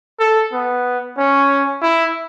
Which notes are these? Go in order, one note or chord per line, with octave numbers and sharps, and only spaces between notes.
A4
B3
C#4
E4